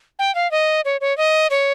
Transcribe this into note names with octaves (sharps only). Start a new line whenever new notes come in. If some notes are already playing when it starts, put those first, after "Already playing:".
G5
F5
D#5
C#5
C#5
D#5
C#5